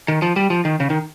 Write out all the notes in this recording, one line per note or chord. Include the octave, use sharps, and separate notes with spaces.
D#3
F3
G3
F3
D#3
C#3
D#3